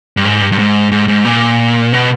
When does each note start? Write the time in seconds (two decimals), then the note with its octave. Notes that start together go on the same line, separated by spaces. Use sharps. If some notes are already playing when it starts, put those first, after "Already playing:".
0.17 G2
0.25 G#2
0.42 G2
0.52 G2
0.59 G#2
0.92 G#2
1.08 G#2
1.25 A#2
1.92 B2